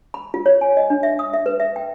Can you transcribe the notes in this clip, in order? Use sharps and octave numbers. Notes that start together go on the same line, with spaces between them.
B5
F4
C#5
G#5
D#5
D4
E5
D#6
E5
B4
E5
G5